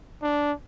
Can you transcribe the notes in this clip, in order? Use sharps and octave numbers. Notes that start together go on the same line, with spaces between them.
D4